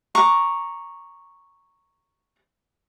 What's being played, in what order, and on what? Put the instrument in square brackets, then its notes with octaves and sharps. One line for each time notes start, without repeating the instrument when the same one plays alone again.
[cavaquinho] A#5 C#6 D6